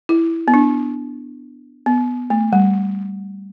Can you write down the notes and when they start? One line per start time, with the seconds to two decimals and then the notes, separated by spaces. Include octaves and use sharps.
0.09 E4
0.48 B3
0.54 D4
1.86 B3
2.30 A3
2.53 G3